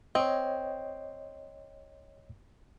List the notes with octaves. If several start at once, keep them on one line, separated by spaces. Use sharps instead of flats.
C4 C#5 D#5